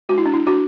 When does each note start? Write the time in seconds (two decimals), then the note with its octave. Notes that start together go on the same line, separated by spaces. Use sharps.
0.09 G#3 F#4
0.13 D4
0.18 E4
0.26 D4
0.34 E4
0.47 D4 F#4